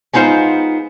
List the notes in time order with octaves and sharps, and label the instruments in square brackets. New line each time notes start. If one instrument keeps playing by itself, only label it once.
[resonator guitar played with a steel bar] G#3 B3 D#4 F4 C5